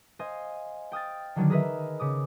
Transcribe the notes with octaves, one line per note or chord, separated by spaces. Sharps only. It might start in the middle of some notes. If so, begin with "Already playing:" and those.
C5 D#5 F5 G#5
G5 D#6 F6 A6
D3 D#3 F#3 D4
G#4 A#4 B4 D#5 E5
C#3 D6 D#6